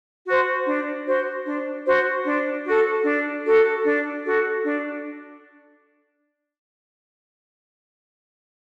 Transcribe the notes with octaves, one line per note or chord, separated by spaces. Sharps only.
F#4 C5
D4
F#4 C5
D4
F#4 C5
D4
F#4 A4
D4
F#4 A4
D4
F#4 A4
D4